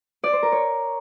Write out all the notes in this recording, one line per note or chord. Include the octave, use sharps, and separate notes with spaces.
D5
C5
A#4
C#5